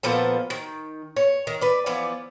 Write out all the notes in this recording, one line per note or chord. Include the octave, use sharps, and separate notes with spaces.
A#2 F3 B3 A4
D#3
C#5
D#3
B4 D5
E3 F3 B3 D5